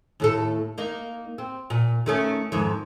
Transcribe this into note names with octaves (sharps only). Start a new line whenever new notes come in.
D#2 A2 A4
A#3 D#4
C4
A#2
D#3 A3 C#4
F2 G#2 D#3